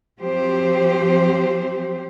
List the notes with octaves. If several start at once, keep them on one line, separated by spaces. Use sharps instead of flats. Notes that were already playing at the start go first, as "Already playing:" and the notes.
F3 F#3 C4 G4 C5